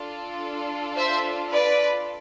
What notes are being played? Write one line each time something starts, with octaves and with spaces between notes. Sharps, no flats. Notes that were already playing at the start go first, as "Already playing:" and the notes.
Already playing: D4 F4 A4
C5 E5
B4 D5